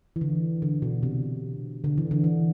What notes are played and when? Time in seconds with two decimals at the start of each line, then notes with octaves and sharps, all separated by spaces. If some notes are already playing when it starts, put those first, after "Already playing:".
0.16 E3
0.21 D3
0.62 D3
0.82 B2
1.03 C3
1.84 D3
1.98 E3
2.11 D3
2.24 E3